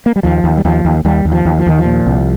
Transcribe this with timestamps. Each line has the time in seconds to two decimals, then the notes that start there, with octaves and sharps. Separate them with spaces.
0.06 A#3
0.16 G3
0.23 D#2 F3
0.44 D#2
0.57 G3
0.65 D#2 F3
0.85 D#2
1.05 D#2 G3
1.25 D#2
1.32 F3
1.45 D#2
1.59 F3
1.66 D#2 D#3
1.79 F3
1.85 A#2
2.06 C2